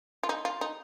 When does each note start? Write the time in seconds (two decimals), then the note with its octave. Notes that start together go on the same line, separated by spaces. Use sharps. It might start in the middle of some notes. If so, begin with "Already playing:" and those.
0.23 F4
0.29 D#4
0.45 F4
0.61 D#4